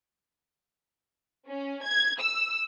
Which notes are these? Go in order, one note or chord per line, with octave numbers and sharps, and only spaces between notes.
C#4
G#6
E6